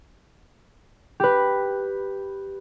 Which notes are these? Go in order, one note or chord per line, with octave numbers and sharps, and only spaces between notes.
G4 B4